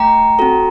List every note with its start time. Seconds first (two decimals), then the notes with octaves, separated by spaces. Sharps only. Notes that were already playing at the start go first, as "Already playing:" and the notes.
Already playing: A3 G5 A#5
0.39 C4 F#4 A4